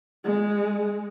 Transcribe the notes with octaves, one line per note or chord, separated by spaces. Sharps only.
G#3